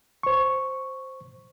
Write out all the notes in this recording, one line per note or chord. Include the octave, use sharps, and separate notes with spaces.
C5 C#6